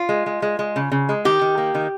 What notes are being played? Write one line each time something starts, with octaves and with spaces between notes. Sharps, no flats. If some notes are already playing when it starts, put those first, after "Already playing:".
Already playing: F4
G#3
G#3
G#3
G#3
C#3
C#3
G#3
D#3 G4
D#3
A#3
D#3